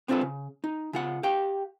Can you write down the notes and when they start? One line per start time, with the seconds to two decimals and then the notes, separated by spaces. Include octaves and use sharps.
0.08 B3 C4 D4 F4 A4 B4
0.21 C#3
0.64 D#4
0.93 C#3 F4 F#5
1.23 G4 F5 G5